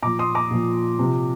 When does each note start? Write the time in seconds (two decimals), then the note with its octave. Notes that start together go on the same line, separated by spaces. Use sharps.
0.02 A#2 F3 A#5 D6
0.19 C6 D#6
0.35 A#5 D6
0.51 A#2 F3
0.99 C3 F3